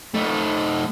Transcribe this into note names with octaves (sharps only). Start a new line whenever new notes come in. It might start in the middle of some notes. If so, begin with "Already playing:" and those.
A3 D#4